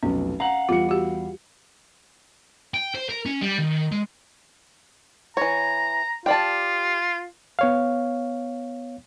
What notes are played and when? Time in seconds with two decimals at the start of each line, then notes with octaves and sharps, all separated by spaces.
0.03 F1 B1 C#4
0.40 F5 F#5 A#5
0.69 E2 G3 F4 C#7
0.89 F#4 G4
2.74 G5
2.94 C5
3.09 A#4
3.26 C#4
3.42 G3
3.59 D#3
3.92 G#3
5.37 E3 C#5 A#5
6.26 F4 G4 D5 A5
7.59 B3 C#5 F5